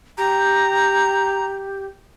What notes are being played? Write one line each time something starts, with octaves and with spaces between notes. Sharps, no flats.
G4 A#5